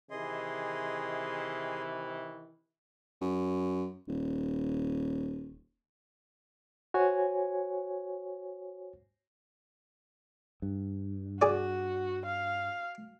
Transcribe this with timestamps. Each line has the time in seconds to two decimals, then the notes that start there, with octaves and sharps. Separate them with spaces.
0.11 C3 D#3 E3 G#4 D#5 C6
3.21 F#2
4.08 D#1
6.94 F#4 C5 C#5 G#5
10.62 G2
11.42 F#4 G#4 D5
12.25 F5